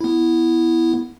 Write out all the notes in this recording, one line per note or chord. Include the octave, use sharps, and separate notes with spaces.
B3 E4